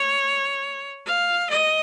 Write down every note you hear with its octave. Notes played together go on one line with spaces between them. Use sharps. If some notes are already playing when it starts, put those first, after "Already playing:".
Already playing: C#5
F5
D#5